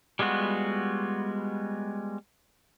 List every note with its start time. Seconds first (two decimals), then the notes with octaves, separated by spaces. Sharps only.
0.19 G3 G#3 B3 F4 F#4